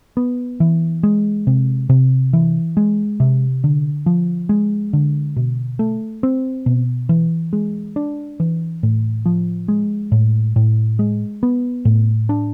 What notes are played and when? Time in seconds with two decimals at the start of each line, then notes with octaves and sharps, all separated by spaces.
0.17 B3
0.60 E3
1.03 G#3
1.47 C3
1.89 C3
2.33 E3
2.77 G#3
3.20 C3
3.64 D3
4.06 F3
4.49 G#3
4.93 D3
5.36 B2
5.79 A3
6.23 C4
6.66 B2
7.09 E3
7.53 G#3
7.96 D4
8.40 E3
8.83 A2
9.26 F3
9.68 G#3
10.12 A2
10.56 A2
10.99 G#3
11.43 B3
11.85 A2
12.29 D4